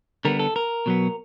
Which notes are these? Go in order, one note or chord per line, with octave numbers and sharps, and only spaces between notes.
D3 G3 B3 A#4
A4
A#4
B2 F#3 B3